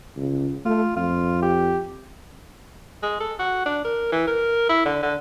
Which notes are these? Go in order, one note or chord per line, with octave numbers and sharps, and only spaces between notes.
C#2
A3 F4
F2 F4
G4
G#3
A4
F#4
D4
A#4
E3
A#4
E4
D3
D3